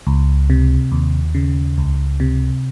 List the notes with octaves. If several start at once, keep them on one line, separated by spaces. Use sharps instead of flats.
C#2
C3
D#2
C#3
C#2
C3